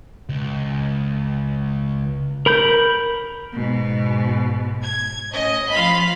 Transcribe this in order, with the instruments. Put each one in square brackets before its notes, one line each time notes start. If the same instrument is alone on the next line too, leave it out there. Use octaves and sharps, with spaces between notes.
[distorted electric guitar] C#2
[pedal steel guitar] A#4 B5 G6
[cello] G#2 B2
[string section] G#6
[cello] A2 C#4 [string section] D#5
[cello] F3 F4 [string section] F5 B5